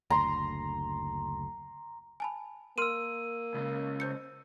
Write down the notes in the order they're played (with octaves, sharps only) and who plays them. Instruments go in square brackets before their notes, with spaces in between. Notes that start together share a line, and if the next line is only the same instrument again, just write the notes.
[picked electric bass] F#1 D2 [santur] A#5 C6
[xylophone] G#5 A5 B5
[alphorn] A#3 [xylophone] A#4 C6 F6 [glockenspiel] E6 D#7
[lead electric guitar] C#2 C#3
[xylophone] C5 G6 C#7